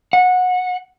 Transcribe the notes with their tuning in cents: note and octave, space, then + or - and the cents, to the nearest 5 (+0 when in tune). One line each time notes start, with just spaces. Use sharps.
F#5 -20